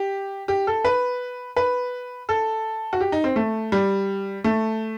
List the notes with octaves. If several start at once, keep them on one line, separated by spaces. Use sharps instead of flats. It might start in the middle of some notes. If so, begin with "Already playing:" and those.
Already playing: G4
G4
A4
B4
B4
A4
F#4
G4
D#4
C4
A3
G3
A3